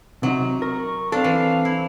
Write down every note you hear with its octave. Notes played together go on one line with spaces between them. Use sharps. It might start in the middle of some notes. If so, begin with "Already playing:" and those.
C3 F#3 D#4
A#4 C#6
C4 D4 A4 F5
E3
E4